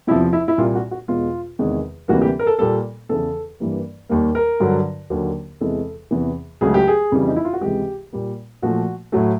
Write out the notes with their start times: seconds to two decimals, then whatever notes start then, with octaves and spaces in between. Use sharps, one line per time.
0.07 E2 C3 F3 E4
0.33 E4
0.48 E4
0.58 C2 A#2 G3 A#3 F4
0.75 F#4
0.91 F#4
1.08 E2 B2 G#3 F4
1.59 E2 C3 D#3 G#3
2.08 D2 C3 E3 G3 A#3 F#4
2.22 G4
2.39 A#4
2.47 A4
2.59 A#2 G3 A#3 A4
3.09 E2 C#3 E3 A4
3.60 G2 E3 G3 A#3
4.09 D#2 D#3 G3 A#3
4.35 A#4
4.60 G2 D3 F#3
5.10 D#2 D3 F#3 A#3
5.60 E2 C3 E3 G#3 A4
6.11 E2 C3 E3
6.61 C#2 C#3 F#3 A3 G#4
6.74 G4
6.88 G#4
7.12 F2 C#3 E3 G3
7.27 D#4
7.36 E4
7.45 F4
7.53 F#4
7.61 C#2 C3 E3 G#3 G4
8.13 A#2 G3 A#3
8.62 A#2 F3 A3 F#4
9.12 A2 F#3 A3